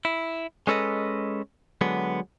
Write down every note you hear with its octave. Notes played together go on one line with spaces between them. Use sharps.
E4
G#3 C#4 A4 B4 D#5
D3 F#3 G#3 B3